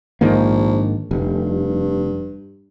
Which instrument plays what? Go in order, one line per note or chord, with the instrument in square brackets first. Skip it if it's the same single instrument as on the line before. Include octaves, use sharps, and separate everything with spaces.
[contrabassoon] A#1 [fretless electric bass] G#2 D#3 A#3
[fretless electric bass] F1 [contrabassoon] G2